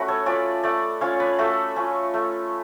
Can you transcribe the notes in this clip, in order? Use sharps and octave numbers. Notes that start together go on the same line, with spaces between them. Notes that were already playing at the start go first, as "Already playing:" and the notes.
Already playing: A3 C#4 F#4 B4
A4 C#5
C#4 F4 B4 D5
A3 D5 F#5
C#4 F4 C#5 F5
B4 D5
A3 F#4 A4
C#4 F4
A3